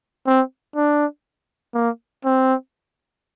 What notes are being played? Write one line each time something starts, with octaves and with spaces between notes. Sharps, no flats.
C4
D4
A#3
C4